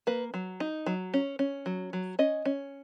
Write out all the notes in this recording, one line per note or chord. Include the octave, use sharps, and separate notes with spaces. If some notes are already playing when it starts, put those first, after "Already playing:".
A#3 B4
F#3
D#4
F#3
C#4
C#4
F#3
F#3
C#4 D#5
C#4